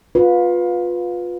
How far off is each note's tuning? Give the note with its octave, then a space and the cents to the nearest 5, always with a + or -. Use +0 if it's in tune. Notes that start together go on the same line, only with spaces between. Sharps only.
F4 +25 B4 +0